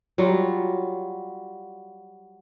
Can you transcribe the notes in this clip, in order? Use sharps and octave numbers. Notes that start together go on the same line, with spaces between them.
F#3 G3 F4